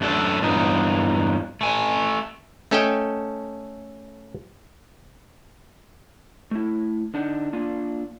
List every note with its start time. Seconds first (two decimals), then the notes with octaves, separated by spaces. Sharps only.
0.01 F#2 A3 D4 F#4 A4
0.42 E2 G2 F#3 D#4
1.61 A3 G#5
2.71 A3 C#4 A4 D#5 G5
6.51 A3 E4
7.14 D3 D4 D#4 F#5
7.53 A#3 D4 F4